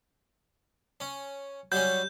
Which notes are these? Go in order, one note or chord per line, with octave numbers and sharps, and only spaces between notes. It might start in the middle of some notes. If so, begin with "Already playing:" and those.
C#4
F#3 G3 C#4 G6